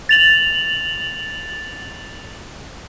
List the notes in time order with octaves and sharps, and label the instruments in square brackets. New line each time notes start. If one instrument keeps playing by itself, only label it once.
[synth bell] A6 F7 F#7